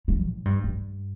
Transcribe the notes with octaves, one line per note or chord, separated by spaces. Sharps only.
G3
A2
G2
G2